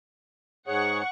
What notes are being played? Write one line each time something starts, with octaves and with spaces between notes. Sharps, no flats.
G#2 G#4 C#5 F#5 C#6